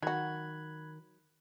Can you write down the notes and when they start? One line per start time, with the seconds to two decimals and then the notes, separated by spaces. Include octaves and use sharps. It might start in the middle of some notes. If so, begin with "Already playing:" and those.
0.02 D#3 F#3 F#4 B5 F#6 G#6